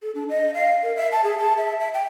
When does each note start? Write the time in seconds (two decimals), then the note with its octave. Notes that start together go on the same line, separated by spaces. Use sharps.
0.02 A4
0.15 D4
0.29 D#5
0.54 F5
0.83 A#4
0.96 E5
1.12 A5
1.24 G#4
1.38 A5
1.58 E5
1.80 E5
1.94 G5